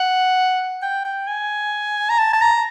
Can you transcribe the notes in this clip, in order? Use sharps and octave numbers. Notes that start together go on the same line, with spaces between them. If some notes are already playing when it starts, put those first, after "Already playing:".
Already playing: F#5
G5
G5
G#5
A#5
A5
A5
A#5